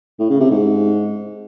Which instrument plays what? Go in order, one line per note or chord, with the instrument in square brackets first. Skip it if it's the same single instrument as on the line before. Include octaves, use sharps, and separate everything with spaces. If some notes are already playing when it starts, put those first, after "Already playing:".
[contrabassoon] A2
C#3
C3
G#2